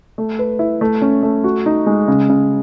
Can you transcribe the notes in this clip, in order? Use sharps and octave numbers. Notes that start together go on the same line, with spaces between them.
A3
B4
E4
A3
C#4
A3
F#4
D#4
G#3
C#3
C#3